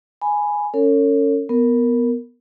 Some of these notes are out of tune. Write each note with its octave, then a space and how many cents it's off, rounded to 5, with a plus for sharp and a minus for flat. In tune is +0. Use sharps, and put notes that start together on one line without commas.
G#5 +0 B5 +0
C#4 +5 A4 +45 C#5 +0
B3 +0 A#4 -5